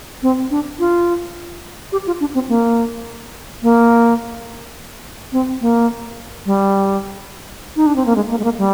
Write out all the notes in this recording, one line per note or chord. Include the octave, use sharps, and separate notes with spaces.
C4
D4
F4
G4
F4
D4
C4
A#3
A#3
C4
A#3
G3
D#4
D4
C4
A#3
G#3
A#3
G#3
A#3
G3